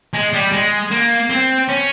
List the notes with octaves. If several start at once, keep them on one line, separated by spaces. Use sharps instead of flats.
G#3
G3
G#3
A#3
C4
C#4